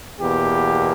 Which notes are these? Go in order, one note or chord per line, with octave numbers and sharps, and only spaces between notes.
E2 B2 A#3 G4